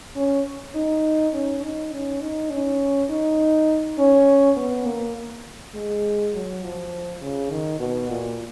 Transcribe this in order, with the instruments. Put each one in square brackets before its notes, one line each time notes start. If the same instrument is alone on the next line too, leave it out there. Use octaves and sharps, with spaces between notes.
[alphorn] C#4
D#4
C#4
D#4
C#4
D#4
C#4
D#4
C#4
B3
A#3
G#3
F#3
F3
C#3
D#3
B2
A#2